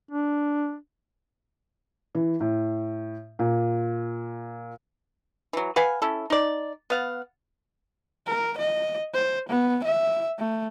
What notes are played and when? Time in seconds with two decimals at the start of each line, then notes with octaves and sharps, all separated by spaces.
0.11 D4
2.15 E3
2.40 A2
3.39 A#2
5.53 E3 F#3
5.76 B4 F5 F#5 G#5
6.02 C#4 E4 A4
6.30 D#4 D5
6.90 B3 F5 F#5
8.27 A#4
8.58 D#5
9.14 C5
9.49 B3
9.84 E5
10.39 A3